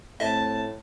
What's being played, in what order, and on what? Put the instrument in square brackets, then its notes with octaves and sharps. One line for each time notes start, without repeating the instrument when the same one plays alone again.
[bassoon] A2 [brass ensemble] A3 C4 [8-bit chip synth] D#5 E5 [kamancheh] A5